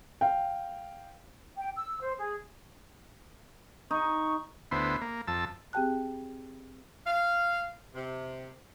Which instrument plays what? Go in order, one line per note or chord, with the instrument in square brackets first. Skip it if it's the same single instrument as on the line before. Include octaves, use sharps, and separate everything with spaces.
[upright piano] F5 G5
[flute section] G5
E6
C5
G#4
[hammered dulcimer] D#4 [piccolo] C#6
[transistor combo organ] D2 B3 E4 C5
A#3
F2 A5 E6
[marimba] C4 G4 G#4 G5 A5 F#6
[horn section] F5
C3